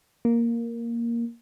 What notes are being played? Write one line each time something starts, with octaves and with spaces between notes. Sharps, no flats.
A#3